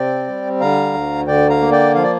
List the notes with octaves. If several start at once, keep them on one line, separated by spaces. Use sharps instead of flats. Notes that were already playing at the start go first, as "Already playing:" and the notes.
Already playing: C3 C4 D5 G5
G3
D3 F5 A#5
D2
D3 D5 G5
F5 A#5
A#3
D5 G5
F3 F5
D5